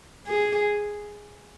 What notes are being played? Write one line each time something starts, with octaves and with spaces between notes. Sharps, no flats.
G#4